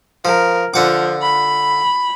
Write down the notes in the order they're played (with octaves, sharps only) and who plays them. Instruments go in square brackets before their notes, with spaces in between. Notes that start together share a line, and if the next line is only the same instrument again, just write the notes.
[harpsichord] F3 [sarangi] A#4
[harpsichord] D3 F#5 D6 [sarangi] F3
[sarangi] B5